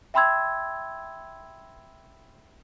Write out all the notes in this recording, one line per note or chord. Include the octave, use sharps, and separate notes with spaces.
E5 G5 B5 C6 E6 G#6